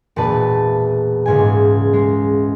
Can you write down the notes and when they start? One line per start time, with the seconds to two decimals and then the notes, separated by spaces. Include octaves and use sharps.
0.16 E1 A#2 B4 A5
1.26 C#2 G#2 G#5
1.93 G#3